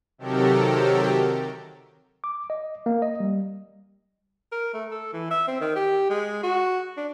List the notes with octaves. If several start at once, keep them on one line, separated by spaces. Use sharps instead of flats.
C3 D#3 F#3 G4 A4 A#4
D6
D#5
A#3
D#5
G3
A#4
A3
A4
E3
E5
C4
D#3
G4
G#3
F#4
D4